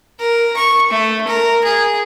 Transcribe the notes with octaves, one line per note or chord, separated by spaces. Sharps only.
A#4
C#6
A3
A#4
G#4